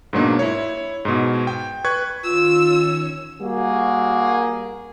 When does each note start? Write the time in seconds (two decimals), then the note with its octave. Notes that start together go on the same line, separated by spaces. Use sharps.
0.13 G#2 B2 F#3 A#3 D4
0.39 E4 C#5
1.05 G#2 B2
1.47 G5
1.85 B4 C#6 F#6 G#6
2.24 D#3 C#4 F4 C#5 E6
3.40 G3 A#3 F#4 G#4